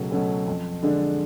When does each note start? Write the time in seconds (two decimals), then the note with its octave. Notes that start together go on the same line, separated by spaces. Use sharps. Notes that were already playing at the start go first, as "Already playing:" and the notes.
Already playing: C#2 B2 F#3 A3 C#4
0.11 B2 F#3 A3 C#4
0.48 F2
0.83 D3 G#3 D4